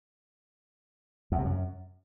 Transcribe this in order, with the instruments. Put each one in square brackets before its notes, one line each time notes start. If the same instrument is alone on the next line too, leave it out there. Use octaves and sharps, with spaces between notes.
[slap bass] E2
C3
F#2